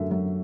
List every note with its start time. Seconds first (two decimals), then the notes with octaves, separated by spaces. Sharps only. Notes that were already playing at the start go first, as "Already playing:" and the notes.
Already playing: F#2 D3 A3 E5
0.11 F#3